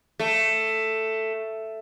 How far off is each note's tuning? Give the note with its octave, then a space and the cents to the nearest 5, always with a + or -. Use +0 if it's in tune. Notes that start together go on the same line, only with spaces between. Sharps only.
A3 +5